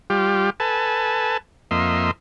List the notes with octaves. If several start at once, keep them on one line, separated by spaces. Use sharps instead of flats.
G3 F4 G4
A4 B4 G#5 A5
F2 A#3 D#5 E5 C6